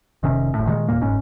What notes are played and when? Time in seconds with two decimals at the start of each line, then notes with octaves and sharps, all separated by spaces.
0.23 F1 C3 D#3 C#4
0.54 F#1 A2
0.66 A#2 D#3 F#3 G#3
0.88 E1 A#2 A#3
1.01 F#1 G#2 C#4